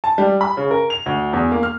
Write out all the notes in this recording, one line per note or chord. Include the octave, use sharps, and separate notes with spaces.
A5
G3
B5
C#3
A#4
F7
D2
E2
A#3
F6